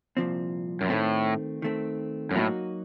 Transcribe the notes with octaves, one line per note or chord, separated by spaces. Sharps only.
C2 A#2 F3 C4
F#2
A2 D#3 A3 C4
D#3 A3 C4
F#2
A2 F#3 A#3 D#4 F#4